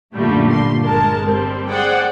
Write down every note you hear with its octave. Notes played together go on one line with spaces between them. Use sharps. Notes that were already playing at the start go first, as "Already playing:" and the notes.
F#2 A#2 D3 G3 A3
G1 C6
G1 G#3 A#4 A5
G3 C4
G#4 C5 D5 F#5 G5